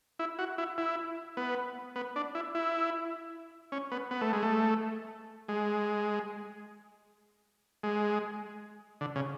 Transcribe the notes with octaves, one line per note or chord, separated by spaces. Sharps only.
E4
F#4
E4
E4
B3
B3
D4
E4
E4
C#4
B3
B3
A3
G#3
A3
G#3
G#3
D3
C#3